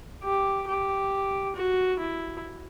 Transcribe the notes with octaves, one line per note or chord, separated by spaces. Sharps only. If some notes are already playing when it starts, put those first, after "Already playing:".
G4
G4
F#4
E4